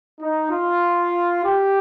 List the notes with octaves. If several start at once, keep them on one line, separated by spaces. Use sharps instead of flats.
D#4
F4
G4